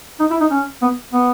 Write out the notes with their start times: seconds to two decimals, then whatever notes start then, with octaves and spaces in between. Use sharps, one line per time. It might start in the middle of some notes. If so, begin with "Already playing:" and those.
0.20 D#4
0.31 E4
0.41 D#4
0.51 C#4
0.82 B3
1.13 B3